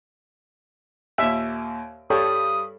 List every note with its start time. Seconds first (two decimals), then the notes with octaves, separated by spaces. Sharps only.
1.18 D#2 A#2 E5
2.10 G2 G3 A4 C#5 G5 D#6